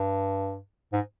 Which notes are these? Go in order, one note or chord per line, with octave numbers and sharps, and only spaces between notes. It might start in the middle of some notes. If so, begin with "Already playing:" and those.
Already playing: G2
G#2